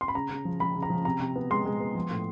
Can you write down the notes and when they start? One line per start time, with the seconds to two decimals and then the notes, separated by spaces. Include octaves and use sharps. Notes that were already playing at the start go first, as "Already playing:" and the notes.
0.01 C6
0.08 B5
0.15 C#3 A#5
0.30 C#3
0.45 F3
0.60 F3 B5
0.75 C#3
0.83 A#5
0.90 F3
1.05 C3 A#5
1.20 C3
1.36 B3
1.50 G#3 C6
1.65 G#3
1.80 B3
1.95 F3
2.10 A2